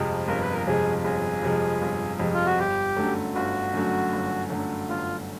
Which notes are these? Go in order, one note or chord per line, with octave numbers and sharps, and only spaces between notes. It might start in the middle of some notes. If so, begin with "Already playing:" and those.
Already playing: G1 F2 C3 F3 G#3
G1 A#4
B4
A#4
F2 C3 F3 G#3 G#4
G1 G#4
F2 C3 F3 G#3
G1
F2 C3 F3 G#3
F4
F#4
G1 G4
F#2 D3 F#3 A3
G1 F#4
F#2 D3 F#3 A3
G1
F#2 D3 F#3 A3
G1 F4